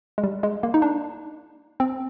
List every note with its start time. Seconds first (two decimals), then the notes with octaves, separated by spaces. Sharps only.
0.18 G#3
0.24 G3
0.43 G#3
0.63 A#3
0.74 D#4
0.82 D4
1.80 C4